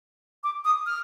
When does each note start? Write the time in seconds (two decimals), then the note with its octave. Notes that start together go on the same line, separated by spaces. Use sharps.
0.44 D6
0.65 D#6
0.86 F6